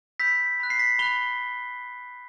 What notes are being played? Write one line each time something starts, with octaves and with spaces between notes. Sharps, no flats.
B5 E6 G6 B6
B5 F#6
C7
B6
B5 F#6 G7